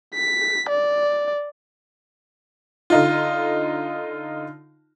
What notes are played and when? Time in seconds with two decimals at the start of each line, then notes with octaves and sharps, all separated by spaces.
0.14 B6
0.69 D5
2.90 D3 D#4 F4